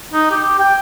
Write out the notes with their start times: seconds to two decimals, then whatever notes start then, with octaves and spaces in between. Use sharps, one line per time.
0.13 D#4
0.31 G4
0.59 G5